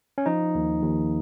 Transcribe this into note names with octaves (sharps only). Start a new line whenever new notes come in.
C#4
F3 D#4
D#2
D#2